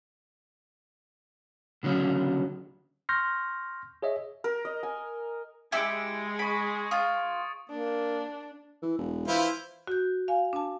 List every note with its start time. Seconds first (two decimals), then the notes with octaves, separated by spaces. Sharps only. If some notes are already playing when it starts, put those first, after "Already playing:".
1.83 C#2 D3 F#3 C#4
3.09 C6 C#6 F6 G6 A#6
4.02 G#4 C#5 D#5 E5
4.44 A#4
4.65 D#5
4.83 G#5
5.72 G#3 E4 G4 G#4 E6 G#6 C#7 D7
6.39 B5 C#6 D7
6.91 F4 D#6 A6
7.70 A#3 D4
8.82 E3
8.98 E1
9.28 E3 E4 F4 C5
9.87 F#4 G6
10.28 F5 G#5
10.53 D4 A5